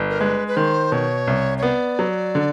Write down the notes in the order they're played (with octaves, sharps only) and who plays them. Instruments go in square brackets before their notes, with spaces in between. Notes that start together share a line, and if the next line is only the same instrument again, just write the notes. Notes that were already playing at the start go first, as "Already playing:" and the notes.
Already playing: [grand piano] G1
[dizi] A#4
[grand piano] G#3 [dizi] B4
[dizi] B4
[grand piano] D#3 [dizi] C5
[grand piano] B2 [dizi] C#5
[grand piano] C2
[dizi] C#5
[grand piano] B3 [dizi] D5
[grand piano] F#3
D3